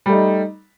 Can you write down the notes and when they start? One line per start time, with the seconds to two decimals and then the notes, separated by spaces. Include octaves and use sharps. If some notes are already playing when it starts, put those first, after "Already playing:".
0.06 G3
0.09 A3
0.12 D#4